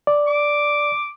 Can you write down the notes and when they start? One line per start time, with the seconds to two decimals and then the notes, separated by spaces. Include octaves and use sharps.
0.07 D5
0.27 D6